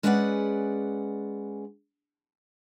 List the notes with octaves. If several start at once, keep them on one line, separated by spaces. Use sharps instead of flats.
G#3 C#4 G#4 B4 D5 F#5